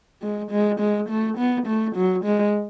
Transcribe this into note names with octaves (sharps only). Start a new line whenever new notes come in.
G#3
G#3
G#3
A3
B3
A3
F#3
G#3